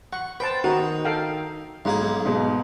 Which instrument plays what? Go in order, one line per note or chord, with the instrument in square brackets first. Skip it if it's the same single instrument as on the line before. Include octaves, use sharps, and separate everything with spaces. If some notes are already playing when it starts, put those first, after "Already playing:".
[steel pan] F#5 [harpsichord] C#6
[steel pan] B4 C5 A5 [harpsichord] G5
[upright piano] D#3 [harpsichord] D#4 [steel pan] F#4
[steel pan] A4 F5 G5
[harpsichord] B1 A#3 G#4 [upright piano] G#2
[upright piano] G#2 B2